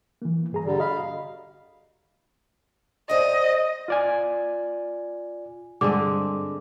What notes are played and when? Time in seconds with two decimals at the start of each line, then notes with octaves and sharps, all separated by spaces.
0.22 E3 A#3
0.52 G2 G#4 A#5
0.64 D3 G3
0.79 F#4 D#5 F5 B5
3.10 C5 D5 D#5 F#5
3.88 F4 D5 G#5
5.81 G2 D3 G#3 C4 D6